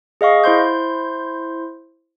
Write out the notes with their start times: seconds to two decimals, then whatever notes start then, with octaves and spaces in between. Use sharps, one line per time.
0.21 G#4 D#5 F5 C#6
0.44 E4 C5 C6 G6